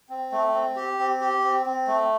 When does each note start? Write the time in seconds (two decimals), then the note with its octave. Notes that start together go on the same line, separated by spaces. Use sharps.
0.09 C4
0.32 A3
0.54 C4
0.76 G4
0.99 C4
1.21 G4
1.44 C4
1.66 C4
1.87 A3